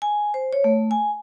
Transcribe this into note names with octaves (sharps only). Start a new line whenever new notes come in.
G#5
C5
C#5
A3
G#5